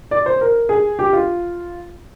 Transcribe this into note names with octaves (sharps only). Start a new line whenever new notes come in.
D5
C5
A#4
G#4
G4
F4